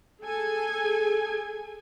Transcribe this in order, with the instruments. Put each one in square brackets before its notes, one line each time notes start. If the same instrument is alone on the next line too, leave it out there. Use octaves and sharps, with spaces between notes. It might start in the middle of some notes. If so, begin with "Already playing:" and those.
[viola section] G#4 A4 G#5